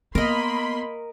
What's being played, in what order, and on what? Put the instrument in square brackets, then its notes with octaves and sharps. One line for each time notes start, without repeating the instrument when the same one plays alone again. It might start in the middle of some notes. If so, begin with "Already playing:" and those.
[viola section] A#3 B5 C6 [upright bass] B3 [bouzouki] A#4 D#5